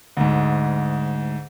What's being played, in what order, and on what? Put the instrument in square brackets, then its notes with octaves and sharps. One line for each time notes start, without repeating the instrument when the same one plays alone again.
[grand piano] D2 G#2